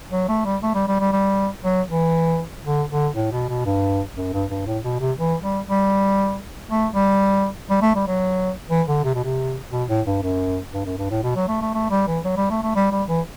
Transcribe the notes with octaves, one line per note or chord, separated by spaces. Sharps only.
F#3
A3
G3
A3
G3
G3
G3
G3
F#3
E3
D3
D3
A2
B2
B2
G2
F#2
G2
G2
A2
B2
C3
E3
G3
G3
A3
G3
G3
A3
G3
F#3
E3
D3
C3
B2
C3
B2
A2
G2
F#2
G2
F#2
G2
A2
B2
F#3
A3
A3
A3
G3
E3
F#3
G3
A3
A3
G3
G3
E3